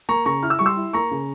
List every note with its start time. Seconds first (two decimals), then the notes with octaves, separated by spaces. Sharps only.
0.09 A#3 A#5 C#6
0.26 C#3 A#5 C#6
0.43 E4 F6
0.50 E6
0.59 G3 C#6
0.66 C6 E6
0.77 E4
0.93 A#3 A#5 C#6
1.11 C#3